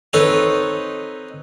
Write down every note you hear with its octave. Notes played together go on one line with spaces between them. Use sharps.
C4 D#4 A4 B4 C#5